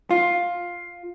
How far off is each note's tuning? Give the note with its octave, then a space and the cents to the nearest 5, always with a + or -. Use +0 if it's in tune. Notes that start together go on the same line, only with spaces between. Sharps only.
F4 +10